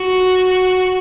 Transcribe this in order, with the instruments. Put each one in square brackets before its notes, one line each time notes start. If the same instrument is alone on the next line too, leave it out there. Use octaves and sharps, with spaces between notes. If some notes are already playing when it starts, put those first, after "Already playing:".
Already playing: [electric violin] F#4